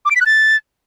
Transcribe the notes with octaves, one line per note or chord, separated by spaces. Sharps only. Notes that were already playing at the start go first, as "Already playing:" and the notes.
D6
D7
B6
F#6
A6